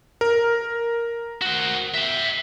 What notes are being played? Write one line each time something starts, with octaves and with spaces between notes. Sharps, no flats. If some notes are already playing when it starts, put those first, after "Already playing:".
A#4
F#4 C5
E5 G5